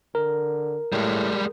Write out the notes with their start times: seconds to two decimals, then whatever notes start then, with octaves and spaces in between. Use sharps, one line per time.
0.15 D3 A#4
0.92 A2 G3 G#3